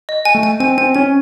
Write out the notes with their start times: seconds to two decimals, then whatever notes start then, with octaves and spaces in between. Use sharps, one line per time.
0.09 D#5
0.25 G#5
0.35 A3
0.43 G#5
0.60 C4 G#5
0.78 C4 G#5
0.95 C#4 G#5